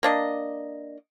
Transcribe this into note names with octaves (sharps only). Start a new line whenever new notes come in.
A#3 D4 D#5